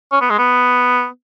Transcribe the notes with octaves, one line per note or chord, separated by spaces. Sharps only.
C#4
B3
G#3
B3